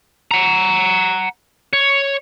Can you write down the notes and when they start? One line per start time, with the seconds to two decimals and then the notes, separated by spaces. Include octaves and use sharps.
0.31 F#5 A#5
1.73 C#5